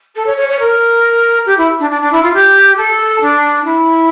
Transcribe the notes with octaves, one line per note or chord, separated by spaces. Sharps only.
A4
C#5
C#5
C#5
A#4
G4
E4
D4
D4
D4
E4
F4
G4
A4
D4
E4